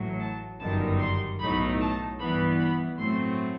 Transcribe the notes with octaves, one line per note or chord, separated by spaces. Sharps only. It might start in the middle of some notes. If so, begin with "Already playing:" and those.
Already playing: A1 A2 F#3
A5
G1 F#2 D#3 G3 D#4 A5
C6
B1 A2 F#3 A3 D#4 B5
A5
G2 E3 B3 B5
B5
A2 F#3 A3 C4 C6